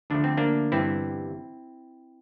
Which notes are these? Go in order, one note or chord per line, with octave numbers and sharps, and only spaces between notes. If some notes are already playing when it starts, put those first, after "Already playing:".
D2 D3 F3 A3 D4
C4
A#3 D4
G1 G2 E3 G3 C4 E4